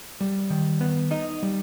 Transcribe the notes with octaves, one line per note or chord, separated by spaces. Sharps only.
G3
D#3
B3
D#4 D#5
G3